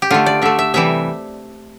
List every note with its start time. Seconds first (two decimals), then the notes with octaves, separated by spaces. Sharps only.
0.02 G4
0.10 D3 A3 F4
0.26 D5
0.42 D3 A3 E5
0.59 E5
0.74 C3 E3 G3 E5